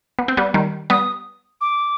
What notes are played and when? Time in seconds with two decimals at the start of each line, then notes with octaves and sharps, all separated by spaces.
0.19 B3
0.28 C4
0.37 G3 B3
0.54 D#3 G3
0.90 G3 B3 D#6
1.61 D6